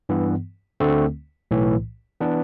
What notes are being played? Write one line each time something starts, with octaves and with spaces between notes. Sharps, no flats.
G2 E3 B3
D2 D3 A3 C4
B1 A2 E3
E3 B3 D4